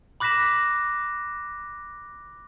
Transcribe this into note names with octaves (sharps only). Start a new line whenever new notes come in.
B5 D6 F#6 A#6 B6 E7